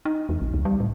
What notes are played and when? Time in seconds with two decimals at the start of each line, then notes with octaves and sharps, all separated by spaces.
0.05 D#4
0.29 E2
0.41 A#1
0.54 C#2
0.65 G3
0.80 A2